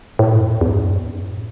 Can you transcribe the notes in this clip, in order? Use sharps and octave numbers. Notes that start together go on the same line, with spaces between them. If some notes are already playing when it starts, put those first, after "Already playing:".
A2
G#2
F#2
E2
E2
G#2
F#2
A2